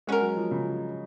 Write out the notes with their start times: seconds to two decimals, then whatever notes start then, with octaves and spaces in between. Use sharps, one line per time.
0.07 G#3 C#4 F#4 A#4
0.22 F#3
0.37 F3
0.51 C#3